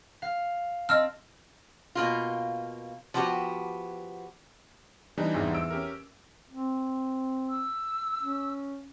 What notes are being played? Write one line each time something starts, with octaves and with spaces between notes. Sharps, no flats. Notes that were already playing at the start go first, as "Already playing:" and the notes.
F5
C4 D#5 A5 E6 F6
B2 A#3 F4
F3 B3 F#4 G4
E3 G3 D4 D#4
G#1 E2
E6 D7
C#4 G4 A#4
C4
E6
C#4